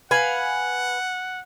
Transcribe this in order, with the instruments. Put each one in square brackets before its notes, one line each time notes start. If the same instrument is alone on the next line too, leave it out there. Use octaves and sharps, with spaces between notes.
[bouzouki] B4 F5 G#5 [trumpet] F#5